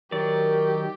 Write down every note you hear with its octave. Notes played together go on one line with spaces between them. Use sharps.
D#3 F#3 G4 A#4 D5